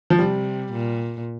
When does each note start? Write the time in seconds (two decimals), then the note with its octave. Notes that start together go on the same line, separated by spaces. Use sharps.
0.10 F3
0.19 C3 G3
0.72 A#2